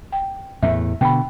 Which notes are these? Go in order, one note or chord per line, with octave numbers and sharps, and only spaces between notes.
G5
E2 A2 E5
B2 D3 G5 B5